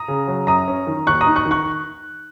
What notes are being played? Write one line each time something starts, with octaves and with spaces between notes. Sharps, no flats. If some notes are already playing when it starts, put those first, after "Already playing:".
Already playing: A#5 D#6
C#3
F#3
F#2 A#5 D#6
C#4
D#3
D#2 C#6 F#6
A#5 D#6
D#4
C#6 F#6
D#3
C#6 F#6